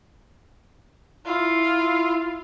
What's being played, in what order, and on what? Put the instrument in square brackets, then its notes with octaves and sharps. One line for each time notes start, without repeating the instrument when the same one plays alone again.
[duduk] E4 [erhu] F4